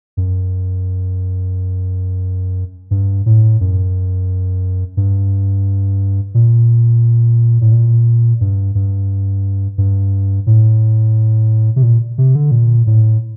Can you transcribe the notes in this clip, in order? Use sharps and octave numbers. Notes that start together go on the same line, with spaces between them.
F#2
G2
A2
F#2
G2
A#2
A2
A#2
G2
G2
G2
A2
C3
A#2
C3
D3
A#2
A2